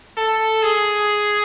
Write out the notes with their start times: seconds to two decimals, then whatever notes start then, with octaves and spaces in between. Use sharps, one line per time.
0.17 A4
0.63 G#4